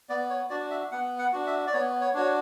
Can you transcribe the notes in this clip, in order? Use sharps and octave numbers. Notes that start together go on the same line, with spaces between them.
B3 D5
C#5
D4 F#4 D5
E5
B3 F#5
F#5
D4 F#4
E5
D5
B3 C#5
C#5
D4 F#4 C#5